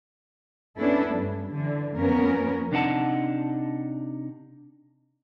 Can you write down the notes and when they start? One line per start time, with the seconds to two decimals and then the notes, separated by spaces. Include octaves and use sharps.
0.77 B3 C#4 D4 E4 A4
1.14 G2
1.53 D3 E3
1.97 F2 A#3 B3 C#4 A#4
2.72 C3 D4 D#4 F#5 A5